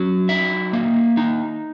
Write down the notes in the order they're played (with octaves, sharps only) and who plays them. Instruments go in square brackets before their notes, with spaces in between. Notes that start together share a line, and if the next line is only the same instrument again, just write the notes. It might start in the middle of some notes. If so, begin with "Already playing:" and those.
Already playing: [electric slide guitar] F#3 C#4
D#4 E5
A#3
D#4